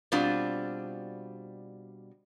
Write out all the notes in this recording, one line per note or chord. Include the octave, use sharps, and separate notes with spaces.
B2 G3 C4 D4 F4